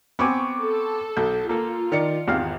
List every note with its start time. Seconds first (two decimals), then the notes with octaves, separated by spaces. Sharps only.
0.19 B3 C4 G#5 C#6 D6
0.59 A4
1.17 B1 G6
1.49 A#3 F4 A4
1.92 D#3 D5 C#7
2.28 G#1 E2 G4 F5